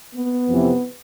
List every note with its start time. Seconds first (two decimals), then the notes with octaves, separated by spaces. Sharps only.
0.15 B3
0.48 F2 C3 E3